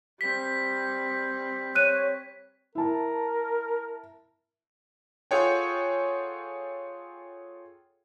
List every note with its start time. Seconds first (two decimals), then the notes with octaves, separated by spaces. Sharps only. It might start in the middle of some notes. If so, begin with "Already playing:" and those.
0.21 G3 C4 B6
1.75 C#5 F#6 D#7
2.75 E4 A#4 A5
5.31 F4 G#4 A4 C#5 F#5 G5